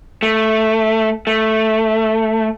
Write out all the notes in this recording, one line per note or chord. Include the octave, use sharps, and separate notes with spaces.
A3
A3